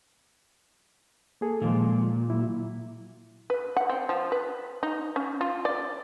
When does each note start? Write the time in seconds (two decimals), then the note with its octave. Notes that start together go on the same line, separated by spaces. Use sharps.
1.41 A#3 G#4 A4
1.62 A#2 D#3 F3 G#3
2.30 F#3 E4
3.50 B4
3.77 F#5
3.89 C4
4.09 F3
4.32 B4
4.83 D#4
5.16 C#4
5.41 F4
5.65 D5